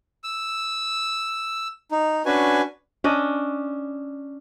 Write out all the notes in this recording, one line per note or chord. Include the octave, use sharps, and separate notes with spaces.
E6
D#4
C#4 D4 F#4 B4 G#5
C#4 D4 D#5